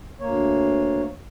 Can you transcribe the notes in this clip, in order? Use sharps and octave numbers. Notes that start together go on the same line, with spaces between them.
D2 A#3 C#5